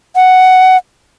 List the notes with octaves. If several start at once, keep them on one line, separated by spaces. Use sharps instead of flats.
F#5